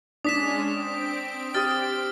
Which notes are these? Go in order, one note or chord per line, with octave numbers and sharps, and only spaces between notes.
G#3 C#4 D4 D#6 B6 E7
C4 D7
G4 D#6 F6 A6